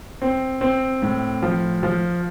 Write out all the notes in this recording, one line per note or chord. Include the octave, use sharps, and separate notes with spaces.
C4
C4
A2
F3
F3